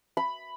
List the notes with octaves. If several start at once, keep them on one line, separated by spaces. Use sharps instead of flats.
B5